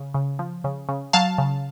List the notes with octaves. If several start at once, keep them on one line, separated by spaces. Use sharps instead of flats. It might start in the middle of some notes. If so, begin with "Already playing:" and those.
Already playing: C#3
C#3
F3
C#3
C#3
F#3 F5 A5
C#3